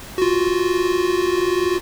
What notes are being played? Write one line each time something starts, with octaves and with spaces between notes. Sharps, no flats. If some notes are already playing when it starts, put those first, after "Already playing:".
F4 F#4